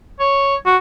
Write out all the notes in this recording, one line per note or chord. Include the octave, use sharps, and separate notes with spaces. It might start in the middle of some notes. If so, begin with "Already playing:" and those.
C#5
F#4